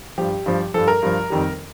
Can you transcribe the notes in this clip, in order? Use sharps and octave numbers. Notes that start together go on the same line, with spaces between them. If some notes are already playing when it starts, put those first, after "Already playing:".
G2 F3 G4
G2 F3
G2 F3 A4
A#4
G2 F3
F2 D#3 G3